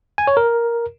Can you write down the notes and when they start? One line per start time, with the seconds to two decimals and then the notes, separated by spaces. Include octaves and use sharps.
0.18 G#5
0.27 C#5
0.37 A#4